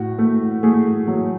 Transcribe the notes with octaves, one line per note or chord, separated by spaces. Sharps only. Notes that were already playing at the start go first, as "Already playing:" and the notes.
Already playing: A2 F#4
A3
A3 G#4
F#3